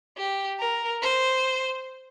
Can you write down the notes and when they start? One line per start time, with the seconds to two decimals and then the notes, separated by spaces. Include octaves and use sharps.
0.17 G4
0.59 A#4
1.02 C5